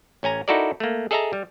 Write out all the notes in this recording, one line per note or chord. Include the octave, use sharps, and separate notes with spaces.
A1 C#4 G#5 A#5
D#4 E4 F#4 A4 A#4 D5
A3 A#3
G#4 A4 D#5 E5 A5 A#5
G3